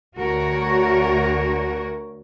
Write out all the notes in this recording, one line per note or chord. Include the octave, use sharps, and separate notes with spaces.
D2 F#4 A#4 C#5